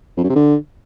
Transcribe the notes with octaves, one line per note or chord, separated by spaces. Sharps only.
F2
F#2
C3
D3